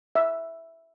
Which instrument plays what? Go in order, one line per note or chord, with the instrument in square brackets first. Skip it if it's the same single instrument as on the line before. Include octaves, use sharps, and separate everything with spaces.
[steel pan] E5